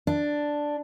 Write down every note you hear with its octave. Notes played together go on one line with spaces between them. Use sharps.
D4